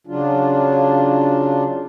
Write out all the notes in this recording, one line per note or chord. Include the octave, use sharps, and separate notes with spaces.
C#3 F#3 D4 F4